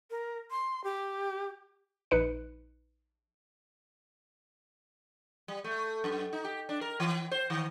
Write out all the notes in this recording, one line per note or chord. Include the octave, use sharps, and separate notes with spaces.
A#4
C6
G4
A#1 D#4 B4 C#7
G3
A3
F#2
D#4
G4
D4
A#4
E3
C5
D#3